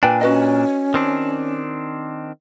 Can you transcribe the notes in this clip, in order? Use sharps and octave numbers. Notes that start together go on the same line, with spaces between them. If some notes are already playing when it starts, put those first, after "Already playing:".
A#2 D4 B4 G5 G#5
C#4 F#4 B4 D#5
D#3 C4 D4